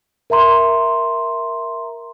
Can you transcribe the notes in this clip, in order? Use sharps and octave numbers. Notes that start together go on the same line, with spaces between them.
A#4 E5 A#5 C6